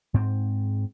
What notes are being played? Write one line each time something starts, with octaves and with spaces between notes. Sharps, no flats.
G#2 C4